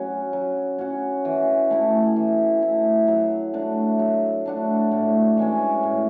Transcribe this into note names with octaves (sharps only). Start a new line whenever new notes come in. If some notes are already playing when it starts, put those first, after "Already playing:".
Already playing: F#3 C#4 F#4
F#3
C#4 F#4
E3
A3 E4
E3
A3 E4
F#3
A3 D4 F#4
F#3
A3 D4 F#4
A2
E3 G#3 C#4
A2